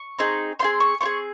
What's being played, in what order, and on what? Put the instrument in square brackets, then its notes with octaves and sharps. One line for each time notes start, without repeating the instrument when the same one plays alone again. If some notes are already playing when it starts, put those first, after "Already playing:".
Already playing: [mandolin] C#6
C4 D#4 G#4
C4 F4 G#4 C6
C#6
C4 F4 C#6
G#4